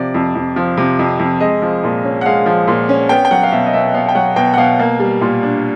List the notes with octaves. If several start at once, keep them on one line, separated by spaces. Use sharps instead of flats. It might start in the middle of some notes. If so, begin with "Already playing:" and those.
Already playing: C3 F3 D5
F2
F2
F3
C3
F2
F2
G#3 D#5
F3
A#2
C#4
F#5
G#3 F5
F3
A#2
C#4
B3 G5
G5
F#3 F#5
F5
B2 E5
D#5
B2 E5
B3 F5
G5
F#3 F#5
B2 G5
F#5
B2 F5
A#3
G3
A#2
D4